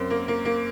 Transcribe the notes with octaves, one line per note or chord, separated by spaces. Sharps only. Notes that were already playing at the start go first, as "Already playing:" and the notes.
Already playing: F#2 C4
A#3
A#3
A#3